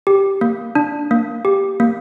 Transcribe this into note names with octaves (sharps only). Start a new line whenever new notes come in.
G4
A#3
D4
A#3
G4
A#3